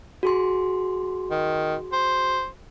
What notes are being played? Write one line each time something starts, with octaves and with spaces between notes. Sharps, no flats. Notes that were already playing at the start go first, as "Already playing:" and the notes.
F#4 G#4 C6
D#3
C5